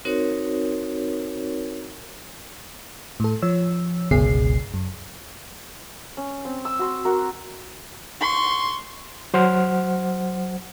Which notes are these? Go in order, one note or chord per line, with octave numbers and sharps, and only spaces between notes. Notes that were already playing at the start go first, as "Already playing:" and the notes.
C4 D#4 F#4 A#4 C5 C#5
A2 A4
F3 C#5 E6
G1 C#2 B2 G#4 C7
F#2
C#4
C4
E6
F#4 C6
F#4 A#4
C6 C#6
F#3 C5 F#5 F6